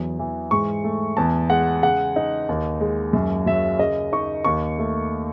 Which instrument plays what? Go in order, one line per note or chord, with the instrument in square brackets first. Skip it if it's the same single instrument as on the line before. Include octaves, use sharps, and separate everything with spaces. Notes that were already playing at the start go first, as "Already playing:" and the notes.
Already playing: [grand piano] E2 F#3
E3
G#2 C#6
A3
E2 A5
G#3 F#5
C#3 F#5
D#4
D#2
G#3
F#2
F#3 E5
C#3 D#5
D#4 C#6
D#2 C#6
A3